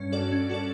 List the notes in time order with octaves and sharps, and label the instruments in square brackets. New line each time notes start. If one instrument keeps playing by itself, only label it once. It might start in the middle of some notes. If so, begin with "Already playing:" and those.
Already playing: [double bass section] G2 [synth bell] C#4
[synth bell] F#4 A4 D5
C#4
F#4 A4 D5